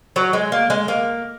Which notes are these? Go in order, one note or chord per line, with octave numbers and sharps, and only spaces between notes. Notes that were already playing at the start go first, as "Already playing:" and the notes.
F#3
G#3
A#3
G#3
A#3